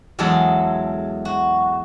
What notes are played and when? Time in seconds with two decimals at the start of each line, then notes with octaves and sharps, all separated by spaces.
0.19 E2 F#3 G#3 G#4 A4
1.25 F#4